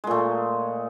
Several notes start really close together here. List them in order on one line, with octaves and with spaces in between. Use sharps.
G#3 A#2 A3